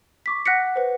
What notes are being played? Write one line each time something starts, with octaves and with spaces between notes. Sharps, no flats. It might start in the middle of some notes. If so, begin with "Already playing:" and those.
C#6 D6 B6
F#5 F#6 A#6 B6 C#7
B4 C5